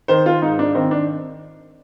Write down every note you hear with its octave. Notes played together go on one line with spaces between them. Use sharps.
D#3 C5
F4
G#2 D#4
D4
D#3 C4
D4